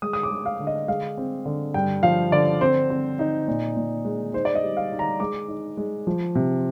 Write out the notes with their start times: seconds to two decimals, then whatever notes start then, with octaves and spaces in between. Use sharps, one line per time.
0.02 G#3 D#6
0.13 D#6
0.23 D6
0.30 G#3
0.46 F5
0.60 D3
0.67 D#5
0.88 G#3 F5
1.17 C4
1.46 D3
1.74 G2 G5
2.03 F3 F5
2.32 D3 D5
2.61 C4 C5
2.90 C4
3.19 D#4
3.48 A#2
3.76 A#2
4.05 G#3
4.34 D#4 C5
4.45 D5
4.55 D#5
4.63 G3
4.77 F5
4.92 D#4
4.99 A#5
5.20 G#3 D6
5.48 D#4
5.77 G#3
6.07 F3
6.35 C3